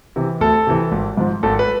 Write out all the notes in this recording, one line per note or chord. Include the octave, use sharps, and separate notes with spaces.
C3 E3
D2 A4
C3 E3
G#1
G#2 F3
G#1 A4
B4